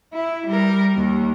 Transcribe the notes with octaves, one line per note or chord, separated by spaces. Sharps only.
E4
G3 A#4
D#2